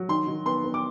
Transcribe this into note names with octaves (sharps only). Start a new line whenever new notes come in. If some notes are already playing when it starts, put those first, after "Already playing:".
Already playing: F#3
D#3 C6
D#3
B3 C6
B3
D6